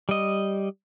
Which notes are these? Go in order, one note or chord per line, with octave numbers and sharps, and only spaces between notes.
G3 D#5